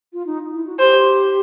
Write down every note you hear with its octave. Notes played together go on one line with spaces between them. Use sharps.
F4
D#4
E4
F#4
G4 C5